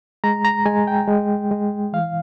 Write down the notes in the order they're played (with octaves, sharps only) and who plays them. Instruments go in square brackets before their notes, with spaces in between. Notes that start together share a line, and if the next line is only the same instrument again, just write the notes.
[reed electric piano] G#3 A#5
A#5
G#3 G#5
G5
G#3
G#3
E3 F5